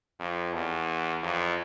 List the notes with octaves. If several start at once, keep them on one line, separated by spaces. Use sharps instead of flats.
F2
E2
F2